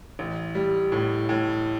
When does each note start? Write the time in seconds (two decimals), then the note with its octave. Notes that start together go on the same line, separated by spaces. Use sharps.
0.19 A1
0.55 G3
0.92 A2
1.29 A2